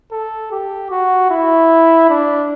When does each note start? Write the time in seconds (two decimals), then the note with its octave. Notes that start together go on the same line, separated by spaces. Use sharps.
0.12 A4
0.52 G4
0.91 F#4
1.30 E4
2.10 D4